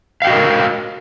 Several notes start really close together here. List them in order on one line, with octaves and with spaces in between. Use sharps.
F5 G5 F#4 D#5 A#4